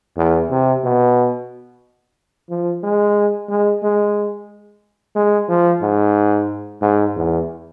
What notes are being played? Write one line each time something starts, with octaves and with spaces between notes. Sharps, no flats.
E2
C3
B2
F3
G#3
G#3
G#3
G#3
F3
G#2
G#2
E2